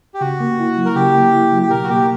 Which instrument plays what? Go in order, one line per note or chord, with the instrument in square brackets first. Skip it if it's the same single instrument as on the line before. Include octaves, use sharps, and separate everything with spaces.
[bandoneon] G4
[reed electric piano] C#3 [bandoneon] F#4
[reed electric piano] A#3
E4
F#3
[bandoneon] A#4
[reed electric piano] C#3 [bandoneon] G4
[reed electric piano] A#3
E4
F#3
[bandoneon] G4
[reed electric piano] B2 [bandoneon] A#4
[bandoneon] F#4
[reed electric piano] A#3 [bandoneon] G4